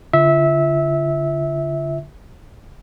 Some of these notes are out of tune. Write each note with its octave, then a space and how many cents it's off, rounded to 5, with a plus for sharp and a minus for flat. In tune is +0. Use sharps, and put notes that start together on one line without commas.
D3 -35 F4 -35 E5 -20